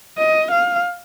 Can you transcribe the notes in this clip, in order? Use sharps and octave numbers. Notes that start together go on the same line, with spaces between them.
D#5
F5